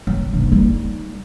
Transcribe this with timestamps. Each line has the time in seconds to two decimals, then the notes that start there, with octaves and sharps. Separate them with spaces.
0.07 F#3
0.34 G2 C3
0.52 G3 D#4